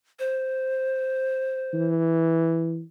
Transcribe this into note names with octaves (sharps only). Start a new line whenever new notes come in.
C5
E3